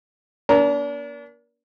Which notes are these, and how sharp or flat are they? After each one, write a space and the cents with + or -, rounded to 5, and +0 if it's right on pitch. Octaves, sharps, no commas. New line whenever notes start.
A#3 +30 D4 -40 A#5 +0